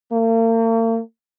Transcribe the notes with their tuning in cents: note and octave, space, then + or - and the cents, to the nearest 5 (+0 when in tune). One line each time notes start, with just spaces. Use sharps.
A#3 -45